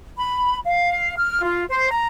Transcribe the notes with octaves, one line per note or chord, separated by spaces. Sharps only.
B5
F5
F6
F4
C5
A#5